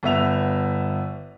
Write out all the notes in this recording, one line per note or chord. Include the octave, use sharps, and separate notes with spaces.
G1 B3 E5 F7